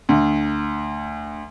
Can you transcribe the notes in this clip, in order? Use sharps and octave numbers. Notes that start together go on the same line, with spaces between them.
D2